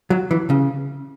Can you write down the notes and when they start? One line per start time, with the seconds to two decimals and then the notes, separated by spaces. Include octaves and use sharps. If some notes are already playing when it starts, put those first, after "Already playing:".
0.10 F#3
0.31 E3
0.50 C#3